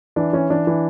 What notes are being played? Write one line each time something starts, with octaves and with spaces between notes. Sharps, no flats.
E3 D4
E3 C#4
E3 D4
E3